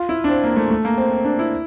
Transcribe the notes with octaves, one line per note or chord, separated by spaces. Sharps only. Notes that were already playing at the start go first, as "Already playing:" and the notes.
Already playing: F4
E4
D4
C4
A#3
A3
A3
A#3
C4
C4
D4
E4